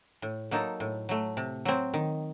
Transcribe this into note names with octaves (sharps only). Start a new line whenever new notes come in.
A2
F#3 A#3 D#4 A4
A2
F#3 A3
C3
F#3 C4
D#3